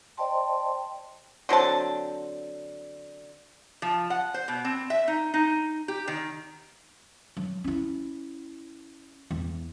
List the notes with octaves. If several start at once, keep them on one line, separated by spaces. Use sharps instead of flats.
C5 D5 D#5 G5 A5 C6
D3 F#3 C4 A5
F3
F#5
C5
B2
C4
E5
D#4
D#4
G4
D#3
F#3
C#4 E4
E2